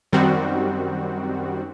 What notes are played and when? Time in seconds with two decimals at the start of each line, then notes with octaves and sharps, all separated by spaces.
0.12 F#2 D#3 G3 C4 F#4